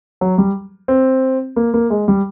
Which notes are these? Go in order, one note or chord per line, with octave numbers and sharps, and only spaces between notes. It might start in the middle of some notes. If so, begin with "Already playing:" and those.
F#3
G3
C4
A#3
A#3
G#3
G3